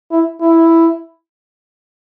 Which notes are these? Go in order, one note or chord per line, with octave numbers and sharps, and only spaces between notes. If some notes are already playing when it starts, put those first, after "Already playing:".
E4
E4